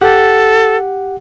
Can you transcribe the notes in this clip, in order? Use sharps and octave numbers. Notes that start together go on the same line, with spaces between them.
G4 A4 F#5